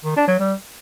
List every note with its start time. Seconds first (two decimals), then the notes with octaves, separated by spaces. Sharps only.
0.04 D#3
0.16 D4
0.28 F#3
0.39 G3